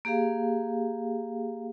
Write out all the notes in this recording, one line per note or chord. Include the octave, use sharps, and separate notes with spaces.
A#3 G4 G#4 F5